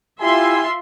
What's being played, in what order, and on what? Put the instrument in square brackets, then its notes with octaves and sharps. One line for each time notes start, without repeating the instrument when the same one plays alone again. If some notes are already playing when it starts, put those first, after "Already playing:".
[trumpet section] E4 G4 G#5 [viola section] F4 E5 C6